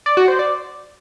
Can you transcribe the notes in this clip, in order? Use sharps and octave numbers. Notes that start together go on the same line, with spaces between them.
D5
F#4
C5
D5